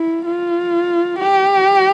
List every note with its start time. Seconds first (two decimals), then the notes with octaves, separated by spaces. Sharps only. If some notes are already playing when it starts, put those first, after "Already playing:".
Already playing: E4
0.26 F4
1.19 G4